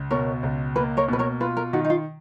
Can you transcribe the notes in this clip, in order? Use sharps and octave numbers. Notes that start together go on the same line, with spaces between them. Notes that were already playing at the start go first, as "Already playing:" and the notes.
Already playing: C#2
B2 A#4 C#5
C#2
A#3 B4
A#4 C#5
B2 B4
A#4 C#5
F4 B4
A#4
D#3 F#4
D#4
F4